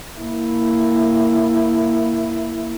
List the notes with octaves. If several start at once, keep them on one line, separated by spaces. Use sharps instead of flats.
A#3 E4